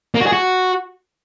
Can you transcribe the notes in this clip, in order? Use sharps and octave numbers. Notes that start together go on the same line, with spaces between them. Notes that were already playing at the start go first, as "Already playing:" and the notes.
A#3
F#4
G#4
F#4